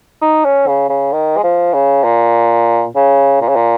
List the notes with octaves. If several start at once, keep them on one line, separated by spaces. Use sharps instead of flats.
D#4
C#4
C#3
C#3
D#3
G#3
F3
C#3
A#2
C#3
A#2
C#3
A#2